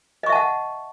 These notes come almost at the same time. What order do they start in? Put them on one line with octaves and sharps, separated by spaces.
D#5 C#6 E5 A5 F#5